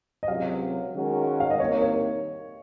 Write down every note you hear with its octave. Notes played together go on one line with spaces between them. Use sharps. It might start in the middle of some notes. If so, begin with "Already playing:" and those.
D#5
C#2 C3 F#3 F5
D#3 G#3 C#4 F#4 A#4
F5
D#5
C2 C3 D#3 A#3 C#5
C#5